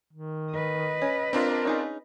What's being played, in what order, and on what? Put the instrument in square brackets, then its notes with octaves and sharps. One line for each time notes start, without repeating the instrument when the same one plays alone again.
[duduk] D#3
[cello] B4 D#5
[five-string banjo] C#4
[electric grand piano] C4 D4 F4 [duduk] A#4
[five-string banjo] C#4 D#4 G#4